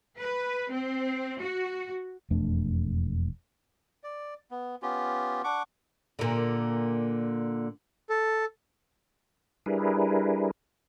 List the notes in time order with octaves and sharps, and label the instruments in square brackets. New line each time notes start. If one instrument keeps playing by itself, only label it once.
[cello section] B4
C4
F#4
[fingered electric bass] E1 F2 A3 D4
[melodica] D5
B3
B3 C#4 F4 G4
D4 F#5 C#6 D6
[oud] A#2 D3
[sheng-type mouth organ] A4
[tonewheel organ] G3 D4 E4 G#4 A#4 B4